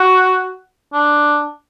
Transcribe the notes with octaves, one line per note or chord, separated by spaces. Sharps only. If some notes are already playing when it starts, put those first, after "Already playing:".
Already playing: F#4
D4